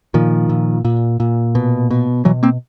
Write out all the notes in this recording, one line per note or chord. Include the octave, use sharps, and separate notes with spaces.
A#2 D#3 F3
A#2
A#2
A#2
B2
B2
B2 E3 F#3
A#3 C4